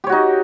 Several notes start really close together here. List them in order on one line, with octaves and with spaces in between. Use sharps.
G4 C#5 F#4 D#4